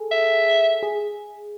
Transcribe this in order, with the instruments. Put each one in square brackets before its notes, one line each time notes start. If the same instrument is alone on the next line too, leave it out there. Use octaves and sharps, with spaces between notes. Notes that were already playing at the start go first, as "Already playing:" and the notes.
Already playing: [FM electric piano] G#4 A4
[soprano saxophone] E5
[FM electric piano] G#4